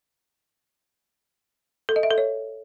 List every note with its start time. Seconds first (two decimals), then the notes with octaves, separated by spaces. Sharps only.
1.89 A4
1.96 D#5
2.03 E5
2.10 A4
2.18 C#5